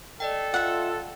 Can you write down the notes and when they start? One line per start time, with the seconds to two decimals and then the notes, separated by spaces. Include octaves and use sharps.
0.20 A4 D5 D#5 G5
0.54 F4 E5 F#5